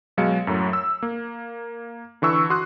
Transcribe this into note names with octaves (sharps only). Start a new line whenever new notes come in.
B2 F#3 G#3 F5 C#7
F#2 A2 F#3
E6
A#3
D3 E3 C#6 E6
F#4 C6 D#6 F#6